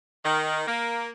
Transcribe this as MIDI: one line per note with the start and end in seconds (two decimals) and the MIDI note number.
0.24 0.62 51
0.67 1.09 58